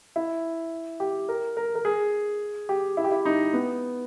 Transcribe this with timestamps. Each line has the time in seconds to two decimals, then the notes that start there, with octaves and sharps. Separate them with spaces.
0.16 E4
1.00 G4
1.29 A#4
1.57 A#4
1.75 A#4
1.85 G#4
2.69 G4
2.97 E4
3.04 G4
3.11 E4
3.25 D#4
3.53 B3